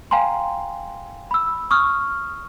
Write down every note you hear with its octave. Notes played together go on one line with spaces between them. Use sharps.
F5 G5 G#5 A#5 C6
B5 E6
C#6 D#6 F6